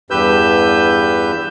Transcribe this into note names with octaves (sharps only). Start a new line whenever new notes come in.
E2 G2 G4 B4 E6 G6